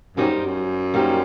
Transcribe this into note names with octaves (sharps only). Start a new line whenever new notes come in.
F#2 G3 A#3 D#4 G4 C5
F#2
G3 A#3 D#4 G4 C5